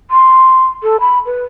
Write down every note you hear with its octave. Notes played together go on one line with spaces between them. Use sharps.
C6
A4
B5
B4